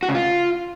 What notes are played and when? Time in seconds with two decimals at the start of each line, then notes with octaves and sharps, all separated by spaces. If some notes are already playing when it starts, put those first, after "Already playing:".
0.03 F#4
0.09 C#3
0.15 F4